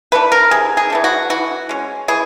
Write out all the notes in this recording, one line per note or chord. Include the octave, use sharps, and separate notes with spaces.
E3 A3 D4 B4
A#4
C3 G#4
G#4
E3 A3 D4
F#4
E3 F#4
G#3 C#4
E3 G#4